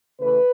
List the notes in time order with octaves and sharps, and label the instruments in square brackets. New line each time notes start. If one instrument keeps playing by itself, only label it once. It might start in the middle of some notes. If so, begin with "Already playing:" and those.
[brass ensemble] C#3 E3 A3 B4